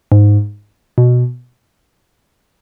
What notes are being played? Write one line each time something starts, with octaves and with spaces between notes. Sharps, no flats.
G#2
B2